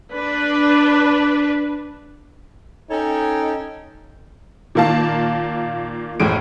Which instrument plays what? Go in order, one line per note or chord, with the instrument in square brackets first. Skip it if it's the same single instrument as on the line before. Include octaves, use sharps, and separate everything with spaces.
[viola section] D4 B4
[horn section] C#4 D#4 A4 C#5 G5
[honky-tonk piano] A#2 D#3 A#3 F5 A5
F#1 D#2 A2 G#4 D7